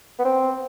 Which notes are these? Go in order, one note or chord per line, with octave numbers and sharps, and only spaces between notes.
B3
C4